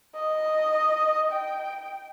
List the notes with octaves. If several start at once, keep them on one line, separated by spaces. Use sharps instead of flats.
D#5
G5